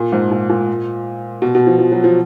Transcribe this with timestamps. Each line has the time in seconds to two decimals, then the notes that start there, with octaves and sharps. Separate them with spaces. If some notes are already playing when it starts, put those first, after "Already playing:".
Already playing: A#2
0.12 G#2
0.31 A#2
0.49 A#2
1.42 B2
1.55 B2
1.67 F3
1.79 F3
1.92 F#3
2.04 F3